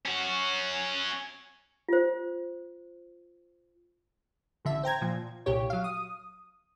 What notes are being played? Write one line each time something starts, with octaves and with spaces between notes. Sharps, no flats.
C#4 F#4
F4 C5
A1 D3 E5
C5 G5 A#5 G#6
A#2 F3
C2 A#2 G4 C#5
F#3 F5
D#6